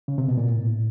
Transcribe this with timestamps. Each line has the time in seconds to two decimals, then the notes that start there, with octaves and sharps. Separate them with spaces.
0.08 C#3
0.18 C3
0.28 B2
0.37 A#2
0.47 A2